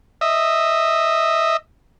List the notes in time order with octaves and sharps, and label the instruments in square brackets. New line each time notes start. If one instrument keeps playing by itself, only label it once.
[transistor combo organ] D#5 E5